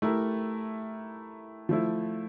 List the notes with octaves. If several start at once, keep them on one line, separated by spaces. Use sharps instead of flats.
A3 E4 G4 A#4
F3 A3 E4